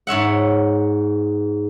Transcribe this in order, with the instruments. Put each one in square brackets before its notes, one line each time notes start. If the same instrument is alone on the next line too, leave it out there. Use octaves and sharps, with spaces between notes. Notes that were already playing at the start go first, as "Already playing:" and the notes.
[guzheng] G#2 C#5 E5 F#5